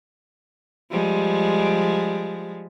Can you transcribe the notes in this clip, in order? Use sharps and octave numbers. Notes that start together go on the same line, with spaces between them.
F3 G3 G#3